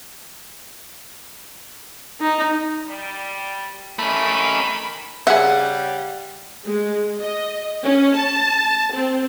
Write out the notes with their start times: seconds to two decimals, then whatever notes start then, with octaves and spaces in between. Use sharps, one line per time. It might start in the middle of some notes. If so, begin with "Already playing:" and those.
2.21 D#4
2.85 G3
3.99 D#3 A3 C#4 B5
5.27 C#3 G3 G#4 E5 F#5
6.65 G#3
7.21 D#5
7.84 C#4
8.15 A5
8.95 C4